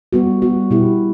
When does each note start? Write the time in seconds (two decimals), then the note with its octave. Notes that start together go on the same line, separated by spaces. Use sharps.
0.13 G3 B3 F#4
0.42 G3 B3 F#4
0.71 B2 G3 B3 E4 G4